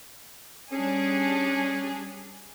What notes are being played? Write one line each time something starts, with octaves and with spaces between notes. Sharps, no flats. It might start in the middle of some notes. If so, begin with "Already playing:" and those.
G3 C#4 D4 G#4